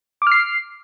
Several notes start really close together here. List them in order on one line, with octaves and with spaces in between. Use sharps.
D6 F6 C7